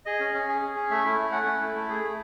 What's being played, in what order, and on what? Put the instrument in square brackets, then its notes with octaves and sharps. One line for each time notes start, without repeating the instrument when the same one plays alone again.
[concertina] G#4 D#5
C#4
C#4
G#4
G#4
C#4
A3 E5
E4
A3
C#4 F#5
A3
E4
A3
G#4
A3